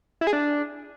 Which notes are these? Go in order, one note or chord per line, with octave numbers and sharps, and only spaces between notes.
E4
G#4
D4